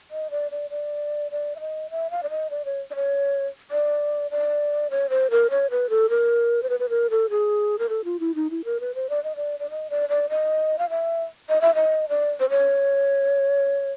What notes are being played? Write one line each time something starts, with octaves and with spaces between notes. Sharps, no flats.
D#5
D5
D5
D5
D5
E5
D#5
E5
F5
D5
D#5
D5
C#5
D5
C#5
D5
D5
C#5
C5
A#4
C#5
B4
A4
A#4
C5
B4
B4
A#4
A4
G#4
A#4
A4
F4
E4
D#4
E4
A#4
B4
C5
D5
D#5
D5
D5
D#5
D5
D5
D#5
F5
E5
D#5
E5
D#5
D5
C5
C#5